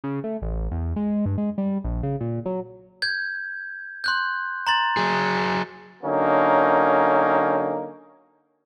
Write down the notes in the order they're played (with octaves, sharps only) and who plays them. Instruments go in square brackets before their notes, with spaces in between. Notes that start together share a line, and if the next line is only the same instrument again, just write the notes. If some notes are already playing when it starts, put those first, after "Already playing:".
[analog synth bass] C#3
A3
A1
E2
G#3
G2
G#3
G3
A#1
C#3
A#2
F#3
[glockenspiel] G6 G#6
C6 F#6 G6
A#5 C6 A6
[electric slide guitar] F#3 G#4
[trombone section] D3 F#3 A#3 C#4 D#4